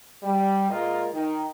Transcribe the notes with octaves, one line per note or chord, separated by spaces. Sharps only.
G3
A#2 G#3 A#3 F4 A#4 D#5
D#3